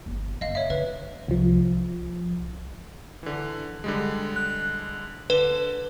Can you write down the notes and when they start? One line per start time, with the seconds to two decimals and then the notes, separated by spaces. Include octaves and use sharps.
0.06 G1
0.41 F#1 D#5 F5
0.55 C#5 E5
0.70 D3 B4
1.28 C2 F3
3.23 D3 E3
3.84 D3 G3 G#3
4.36 F#6
5.30 D3 B4